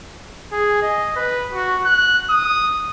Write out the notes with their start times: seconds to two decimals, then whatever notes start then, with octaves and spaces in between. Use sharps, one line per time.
0.52 G#4
0.82 D#5
1.16 B4
1.53 F#4
1.85 F#6
2.30 D#6